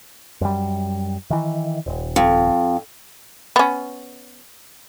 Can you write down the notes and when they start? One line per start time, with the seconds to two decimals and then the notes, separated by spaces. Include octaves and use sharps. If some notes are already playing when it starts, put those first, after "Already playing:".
0.41 F#2 G3
1.30 D#3 E3
1.86 D#1
2.16 F2
3.56 B3 C#4